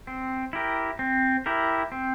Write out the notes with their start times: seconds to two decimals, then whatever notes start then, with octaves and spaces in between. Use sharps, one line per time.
0.07 C4
0.53 E4 G4 A#4
0.99 C4
1.46 E4 G4 A#4
1.92 C4